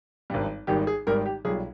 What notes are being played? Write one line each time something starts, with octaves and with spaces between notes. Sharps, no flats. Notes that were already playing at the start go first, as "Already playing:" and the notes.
G#1 G2 G3
G#1 G#2 D#3 G3 G4
G#4
G#1 G#2 D#3 G3 A#4
G4
B1 A#2 G3 G#4